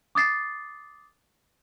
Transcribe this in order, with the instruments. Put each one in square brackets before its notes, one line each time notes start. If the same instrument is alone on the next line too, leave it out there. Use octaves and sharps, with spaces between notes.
[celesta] D6 D#6 A6 C7